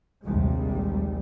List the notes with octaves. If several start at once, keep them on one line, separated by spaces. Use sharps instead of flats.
A#1 D#2 C3 G3 G#3